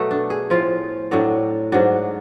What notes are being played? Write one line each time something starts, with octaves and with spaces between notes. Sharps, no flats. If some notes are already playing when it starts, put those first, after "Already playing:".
Already playing: B2 F#3 A3 B3
D4
G#4
A2 F3 F4
A2 F#3 D4
G#2 F#3 D4